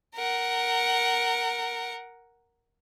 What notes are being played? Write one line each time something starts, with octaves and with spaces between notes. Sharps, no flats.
A#4 F#5